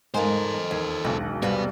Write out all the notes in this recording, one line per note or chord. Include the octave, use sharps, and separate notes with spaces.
G#2 G#3 A4 A#4 C5 F5 G#5
D#2
E1 B1 F#4
C3 G3 B3 F#4 B4 F5